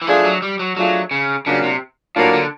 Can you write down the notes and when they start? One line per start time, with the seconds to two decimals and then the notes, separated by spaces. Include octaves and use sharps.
0.02 E3
0.07 F3 A3 D4 F4 G#4
0.25 F#3
0.42 G3
0.59 F#3
0.77 F#3 A3 D4 F4 G#4
1.11 C#3
1.46 C#3 F#3 A#3 D4 F4
1.63 C3
2.16 A2 F#3 A#3 D4 F4
2.33 D3